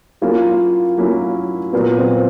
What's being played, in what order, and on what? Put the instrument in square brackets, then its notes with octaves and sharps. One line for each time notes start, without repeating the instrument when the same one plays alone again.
[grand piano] F#3 A#3 C#4 E4 [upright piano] F4
[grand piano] F#3 A#3 C#4 E4
[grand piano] A#2 F#3 A#3 [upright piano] B3
[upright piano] C4